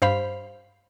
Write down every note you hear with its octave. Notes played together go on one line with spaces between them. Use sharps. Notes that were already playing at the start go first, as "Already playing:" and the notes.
G2 C5 F5 B5